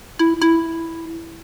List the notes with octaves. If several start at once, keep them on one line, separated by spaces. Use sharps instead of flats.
E4
E4